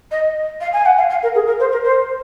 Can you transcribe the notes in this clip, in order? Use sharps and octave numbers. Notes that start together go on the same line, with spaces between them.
D#5
F5
G#5
F#5
F5
F5
A#4
G#4
A#4
C5
A#4
C5